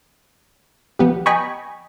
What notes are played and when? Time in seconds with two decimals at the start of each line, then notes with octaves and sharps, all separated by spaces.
0.99 F3 B3 G4
1.26 D#5 G5 G#5 A#5 B5 C#6